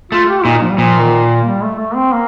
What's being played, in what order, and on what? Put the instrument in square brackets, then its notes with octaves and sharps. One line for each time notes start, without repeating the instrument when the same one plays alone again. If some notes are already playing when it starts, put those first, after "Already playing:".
[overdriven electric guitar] A3 [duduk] F4
[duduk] G4
[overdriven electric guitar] A#2 [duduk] D#4
[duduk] F3
G3
[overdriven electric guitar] A#2 [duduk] F3
[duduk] D#3
G3
A3
A3
C4
A#3